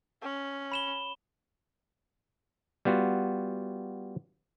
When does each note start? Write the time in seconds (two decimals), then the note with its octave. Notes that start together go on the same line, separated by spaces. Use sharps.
0.22 C#4
0.72 B5 E7 G7
2.85 G3 B3 F4 F#4